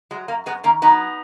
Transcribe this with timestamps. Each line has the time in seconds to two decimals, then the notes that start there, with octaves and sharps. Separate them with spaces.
0.11 F#3 G#3
0.28 F#2 A#3
0.46 F#2 G#3 B3
0.63 D#3 A#3 C#4
0.82 F#3 B3 D#4